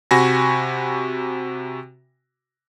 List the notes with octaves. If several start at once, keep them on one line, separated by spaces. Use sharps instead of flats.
C3 F#4 G#5 B5 C#6 A#6